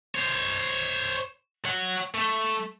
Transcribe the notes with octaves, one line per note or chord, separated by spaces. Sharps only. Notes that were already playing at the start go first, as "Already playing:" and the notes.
C5 C#5
C#5 F#5
A3